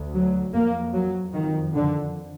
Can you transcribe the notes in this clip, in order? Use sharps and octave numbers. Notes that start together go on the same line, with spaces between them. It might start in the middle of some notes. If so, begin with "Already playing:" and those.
Already playing: D2
F#3
F2 A#3
F#3
F2 D#3
D3